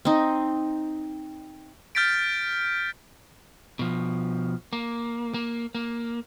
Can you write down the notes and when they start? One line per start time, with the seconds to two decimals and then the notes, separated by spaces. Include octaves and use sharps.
0.05 C4 D#4
1.95 F6 G6 A6 B6 D7
3.79 B2 F3
4.73 A#3
5.34 A#3
5.75 A#3